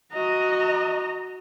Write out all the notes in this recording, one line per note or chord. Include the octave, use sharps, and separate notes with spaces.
F#4 D#5 A#5